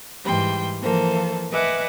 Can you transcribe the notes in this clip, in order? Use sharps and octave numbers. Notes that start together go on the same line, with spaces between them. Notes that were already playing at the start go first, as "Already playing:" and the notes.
G#2 E3 G3 G5 C6
E3 F3 A#3 A4 C5
B4 D#5 E5 F#5 G#5 D6